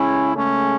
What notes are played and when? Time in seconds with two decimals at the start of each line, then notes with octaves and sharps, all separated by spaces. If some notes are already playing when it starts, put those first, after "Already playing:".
Already playing: C#3 G#3 C#4 E4
0.36 A3 C#4